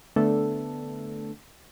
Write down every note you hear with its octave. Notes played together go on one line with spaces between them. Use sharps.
D3 A3 B3 D4 A4